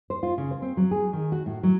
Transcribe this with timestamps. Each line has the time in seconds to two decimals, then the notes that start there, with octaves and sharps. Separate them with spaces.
0.10 C5
0.23 F4
0.38 C#3
0.51 C5
0.62 C4
0.77 F#3
0.91 G#4
1.13 D#3
1.32 F#4
1.46 A2
1.63 F#3